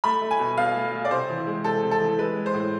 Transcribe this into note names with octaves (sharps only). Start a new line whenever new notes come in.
A3 B5
A3
G#5
B2
B2 F5
A3
A3
D5
C3 C5
E3
G#3
C3 A4
C3
A4
E3
G#3 B4
G#3
C5
A2